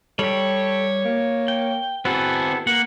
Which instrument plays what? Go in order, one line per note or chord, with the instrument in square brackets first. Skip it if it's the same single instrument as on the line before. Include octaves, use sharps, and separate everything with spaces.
[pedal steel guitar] G3 G4 [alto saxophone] A4 [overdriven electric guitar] C#5
[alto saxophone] A#3
[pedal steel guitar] G5
[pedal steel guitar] B3 E4 A4 [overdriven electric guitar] C4 G#4 [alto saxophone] F#4
[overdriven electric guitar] A#3 [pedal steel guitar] F#5